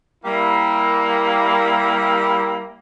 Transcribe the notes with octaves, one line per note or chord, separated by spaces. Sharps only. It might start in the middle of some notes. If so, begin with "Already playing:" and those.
G3 A#3 E4